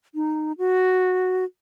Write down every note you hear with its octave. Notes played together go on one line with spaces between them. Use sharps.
D#4
F#4